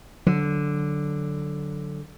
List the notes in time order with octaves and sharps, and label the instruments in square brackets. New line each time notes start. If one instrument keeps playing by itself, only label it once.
[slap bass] D3 [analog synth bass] F#3